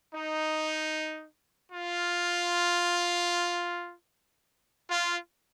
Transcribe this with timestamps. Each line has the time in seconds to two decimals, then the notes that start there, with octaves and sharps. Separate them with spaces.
0.14 D#4
1.72 F4
4.89 F4